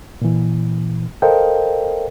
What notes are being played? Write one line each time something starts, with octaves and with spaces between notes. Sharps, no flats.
A#2 E3
A4 A#4 C5 D#5 F5 G5